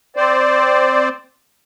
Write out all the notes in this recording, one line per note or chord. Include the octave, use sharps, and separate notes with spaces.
C4 C5 D5